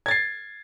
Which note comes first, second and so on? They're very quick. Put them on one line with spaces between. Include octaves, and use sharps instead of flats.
G#6 A6 C7